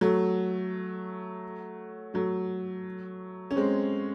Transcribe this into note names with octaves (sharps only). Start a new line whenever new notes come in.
F#3 A3
F#3 A3
C#4
G#3 C4